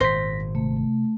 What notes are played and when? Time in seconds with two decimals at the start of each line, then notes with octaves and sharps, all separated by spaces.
0.01 G#1 A#2 C5 A#6 B6
0.55 C3 A3